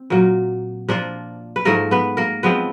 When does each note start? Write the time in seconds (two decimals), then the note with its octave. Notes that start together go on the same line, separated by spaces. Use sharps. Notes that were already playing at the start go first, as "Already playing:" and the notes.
Already playing: C4
0.10 A#2 F#3 A#3
0.88 F3 A#3 D4 F4
1.56 B4
1.65 G#2 F3 A3 A#3 A#4
1.91 B3 B4
2.17 A#3 A#4
2.43 F3 G#3 B3 C4 B4